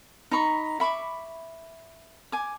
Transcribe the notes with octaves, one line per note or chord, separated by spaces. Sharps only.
D#4 A#5 B5 C#6
E5 B5 C#6 D6
G#5 D6